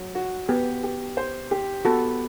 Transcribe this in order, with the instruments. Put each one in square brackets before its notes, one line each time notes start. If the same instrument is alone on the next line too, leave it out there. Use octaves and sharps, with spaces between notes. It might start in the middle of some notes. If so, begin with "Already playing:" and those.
Already playing: [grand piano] F#3
F#4
[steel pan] B3 [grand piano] G4
[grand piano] G4
C5
G4
[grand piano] B3 [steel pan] F#4 A4